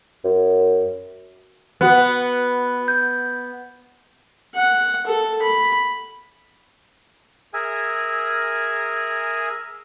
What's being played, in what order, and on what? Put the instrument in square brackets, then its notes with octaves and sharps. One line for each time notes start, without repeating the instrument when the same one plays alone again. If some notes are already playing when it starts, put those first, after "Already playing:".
[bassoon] F#2
[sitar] B3 [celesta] F#4 B4 F#6
[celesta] G6
[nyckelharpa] F#5
A4
B5
[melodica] G#4 A#4 E5 G#5